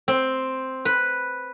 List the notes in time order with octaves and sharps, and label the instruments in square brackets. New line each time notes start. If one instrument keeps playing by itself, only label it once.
[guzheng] C4
B4